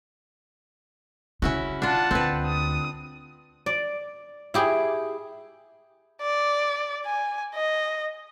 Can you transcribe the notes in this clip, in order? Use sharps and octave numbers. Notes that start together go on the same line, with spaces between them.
C#3 C#4 E4 F#4
D4 F4 F#5 A5
D2 C4 B4
D#6
D5
E4 G4 G#4
D5
G#5
D#5